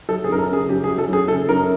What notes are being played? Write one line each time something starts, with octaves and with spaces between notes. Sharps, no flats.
F#3 A4
G#4
F#2 A#4
A4
C#3 G#4
F#2 G4
G#4
F#3
A4
F#2 G#4
C#3 A4
F#2 A#4